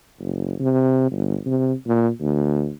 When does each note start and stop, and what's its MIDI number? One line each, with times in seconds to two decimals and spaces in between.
0.20 0.55 30
0.60 1.08 48
1.11 1.37 31
1.46 1.73 48
1.86 2.09 46
2.20 2.72 38